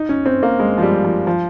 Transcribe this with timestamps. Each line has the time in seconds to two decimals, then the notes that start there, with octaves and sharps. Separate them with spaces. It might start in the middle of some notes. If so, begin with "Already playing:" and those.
Already playing: D#4
0.09 C#4
0.26 C4
0.43 A#3
0.59 G#3
0.78 F3
0.82 G3
1.04 F3
1.27 F3